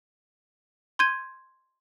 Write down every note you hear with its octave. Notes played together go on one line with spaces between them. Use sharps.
C6 G6 G#6 D#7